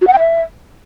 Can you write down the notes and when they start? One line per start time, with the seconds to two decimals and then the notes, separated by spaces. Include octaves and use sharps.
0.01 F#4
0.07 F#5
0.13 G5
0.19 E5